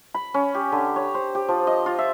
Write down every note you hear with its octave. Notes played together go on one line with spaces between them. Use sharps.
B5
C#4
G4
D3
C#5
C5
G4
F3
D#5
F4
E5